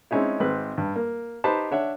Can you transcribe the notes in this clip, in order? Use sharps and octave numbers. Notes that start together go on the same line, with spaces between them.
G#3 C4 C#4 D#4 E4
G#1 C4 B4 F#6
G2
A#3
D#4 G4 B4 C5 A5 B5
D4 C#5 E5 F#5